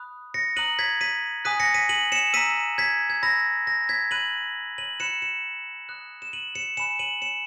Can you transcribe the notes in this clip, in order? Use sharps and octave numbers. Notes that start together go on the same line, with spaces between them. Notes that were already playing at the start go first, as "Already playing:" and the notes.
Already playing: B5 D#6 F#6
A#6 C#7
A#5 D#6 F#6 D#7 F#7
G#6 B6
B6 D#7
G#5 D#6 F#6 B6 D#7
A#6 C#7
B6 D#7
D#7 F#7
C#7 E7
A#5 E6 B6 D#7
G#6 B6
G#6
B5 E6 A#6
A#6
G#6 B6
B5 F#6 D#7 F#7
D#7 F#7
B5 F#6 C#7 E7
C#7 E7
B5 D#6 F#6
E7
D#7 F#7
C#7 E7
G#5 B5 F#6 C#7 E7
D#7 F#7
C#7 E7